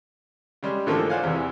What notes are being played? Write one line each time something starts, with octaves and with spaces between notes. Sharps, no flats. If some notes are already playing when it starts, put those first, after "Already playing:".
C#3 G3 G#3
G#2 D3 E3 F3 A3 A#3
G#4 C5 D5 F5 F#5 G#5
E2 C3 E3